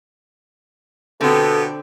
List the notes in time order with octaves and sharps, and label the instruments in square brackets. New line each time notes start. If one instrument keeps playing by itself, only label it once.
[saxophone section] B2 B3 G4 [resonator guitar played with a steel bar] D3 C4 [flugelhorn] A4